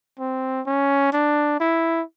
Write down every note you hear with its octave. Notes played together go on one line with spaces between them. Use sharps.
C4
C#4
D4
E4